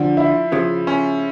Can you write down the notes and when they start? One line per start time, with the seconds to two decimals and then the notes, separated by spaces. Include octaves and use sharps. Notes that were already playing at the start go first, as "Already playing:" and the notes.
Already playing: D3 F3
0.17 E4
0.52 C#3 F3
0.87 C#4